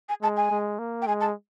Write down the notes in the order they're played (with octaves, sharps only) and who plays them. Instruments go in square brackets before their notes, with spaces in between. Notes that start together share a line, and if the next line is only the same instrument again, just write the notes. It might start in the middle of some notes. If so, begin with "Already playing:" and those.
[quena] G#5
[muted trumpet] G#3 [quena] A5
[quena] G#5
[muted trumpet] G#3
A#3
[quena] G5
[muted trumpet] G#3 [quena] G#5
[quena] A5